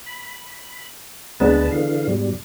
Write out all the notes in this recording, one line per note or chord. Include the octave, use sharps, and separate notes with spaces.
B5
D2 G#3 B3 D4 B4 A5
D3 E3 F5
G#2 B2 G3